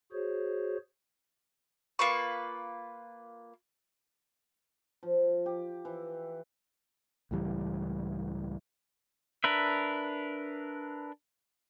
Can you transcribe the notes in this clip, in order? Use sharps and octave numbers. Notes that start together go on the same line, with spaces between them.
F#4 G#4 C5 C#5
A#3 F4 B4 C#6
F3
G4
E3
C#2 A2 E3 G3
D4 A#4 B4 E5